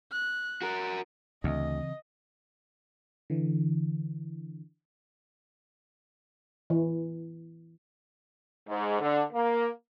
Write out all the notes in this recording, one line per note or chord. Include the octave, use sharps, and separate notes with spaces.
F#6
F#4 A#4
D2 C#3 E3 C4 D#5
D3 E3
E3
G#2
D3
A#3